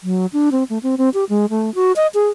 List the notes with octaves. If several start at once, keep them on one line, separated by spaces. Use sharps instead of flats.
F#3
D4
C4
A3
C4
C4
G4
G#3
A3
F#4
D#5
G#4